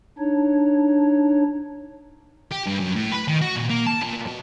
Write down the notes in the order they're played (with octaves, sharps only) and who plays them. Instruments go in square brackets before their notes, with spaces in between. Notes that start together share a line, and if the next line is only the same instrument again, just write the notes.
[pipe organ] D4 D#4 C#5
[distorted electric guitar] G4
G2
F#2
A2
B4
D#3
F#4
A#2
A#3
A5
A#2
B2